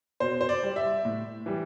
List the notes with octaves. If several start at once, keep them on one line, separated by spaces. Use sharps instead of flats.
B2 C5
C5
D5
G3
E5
A2
E3 G3